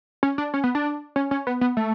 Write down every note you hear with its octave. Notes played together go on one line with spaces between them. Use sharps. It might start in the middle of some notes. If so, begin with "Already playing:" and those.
C#4
D4
C#4
B3
D4
C#4
C#4
B3
B3
A3